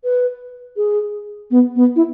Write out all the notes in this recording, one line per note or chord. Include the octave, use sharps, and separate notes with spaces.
B4
G#4
B3
B3
E4